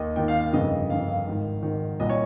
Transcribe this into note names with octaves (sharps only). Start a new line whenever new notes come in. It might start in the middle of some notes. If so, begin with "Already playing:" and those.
Already playing: D#2 D#3 D#5
D#2 D#3 G5
F5
F5
G1 F2 C#3 D#5
G1 F2 C#3 F5
F5
G#1 G#2 D#3
G#1 G#2 D#3
C2 A#2 D#5
C#5